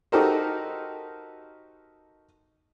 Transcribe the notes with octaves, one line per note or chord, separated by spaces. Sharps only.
D#4 F#4 G4 A4 A#4 C5